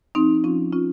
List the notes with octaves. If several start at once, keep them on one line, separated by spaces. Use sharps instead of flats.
F3 C4 D#4
F3 C#4 F4
C#4 F4